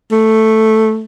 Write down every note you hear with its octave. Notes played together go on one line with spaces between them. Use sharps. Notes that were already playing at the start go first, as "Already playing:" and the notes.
A3